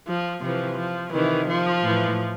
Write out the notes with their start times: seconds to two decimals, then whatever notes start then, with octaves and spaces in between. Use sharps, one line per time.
0.09 F3
0.43 C3 E3 F3
0.78 F3
1.13 C3 D#3 E3
1.48 F3
1.82 A2 E3